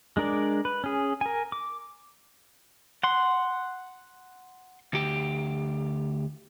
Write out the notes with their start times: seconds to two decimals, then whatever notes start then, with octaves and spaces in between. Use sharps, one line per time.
0.17 G#3 D4 A#4 D5
0.65 B4
0.84 C#4 G#4
1.21 A#4 G#5
1.52 D6
3.03 F#5 C6
4.93 D2 G4